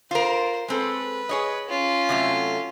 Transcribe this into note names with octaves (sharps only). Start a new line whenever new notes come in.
F4 A#4 C5
G#3 C4 A4 B4
G#4 C#5 D#5
C#4 F4
C3 F#3 A3